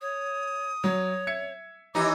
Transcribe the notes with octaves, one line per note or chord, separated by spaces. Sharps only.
C#5 D#6
F#3 C#5
E5 G#6 C#7
D#2 E3 D#4 G4 D6